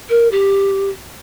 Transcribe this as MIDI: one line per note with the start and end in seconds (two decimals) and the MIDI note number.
0.10 0.28 70
0.32 0.89 67